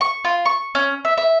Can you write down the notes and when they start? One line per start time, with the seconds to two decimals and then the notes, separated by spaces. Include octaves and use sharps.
0.01 C#6
0.25 F4
0.45 C#6
0.75 C#4
1.05 E5
1.18 E5